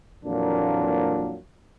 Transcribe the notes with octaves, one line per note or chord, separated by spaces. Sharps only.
F2 A#2 E3 F#3 A#3 D4